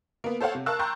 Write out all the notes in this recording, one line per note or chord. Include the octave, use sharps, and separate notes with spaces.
A#3 B3
A4 C5 C#5 F5 F#5
C3
A#4 F5 A5 C#6 E6 F#6
G5 A5 A#5 C6 C#6 G6